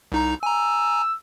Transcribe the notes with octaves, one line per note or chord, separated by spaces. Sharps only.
C2 D#4 A#5
G#5 A#5 E6